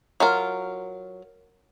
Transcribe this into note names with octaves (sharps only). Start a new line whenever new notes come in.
F#3 F4 A#4